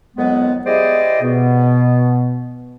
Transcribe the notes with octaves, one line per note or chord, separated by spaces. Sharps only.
F2 D#3 F#3 G#3 B3
E4 G4 G#4 C5 D5 D#5
B2 B3